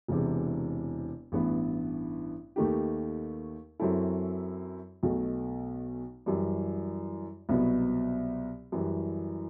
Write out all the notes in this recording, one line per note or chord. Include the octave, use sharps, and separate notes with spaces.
E1 E2 C3 E3
A1 G2 E3 B3
D#2 D#3 A3 D#4 G4
F#2 F#3 C4 E4 A4
B1 B2 A3
F#2 E3 G3
C2 B2 F#3 B3
F#2 E3 G3